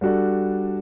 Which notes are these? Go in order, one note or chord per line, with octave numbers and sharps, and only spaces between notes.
G3 D4 F#4 A4 D5